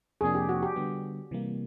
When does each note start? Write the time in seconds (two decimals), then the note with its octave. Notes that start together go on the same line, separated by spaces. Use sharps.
0.21 F2 C3 F3 A#3 D4 G#4
0.35 G4
0.49 F#4
0.63 G4
0.76 D3 G3 B3
1.31 C3 E3 G3 A#3